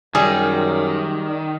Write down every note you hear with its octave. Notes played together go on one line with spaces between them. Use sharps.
F#2 D#3 G3 G#4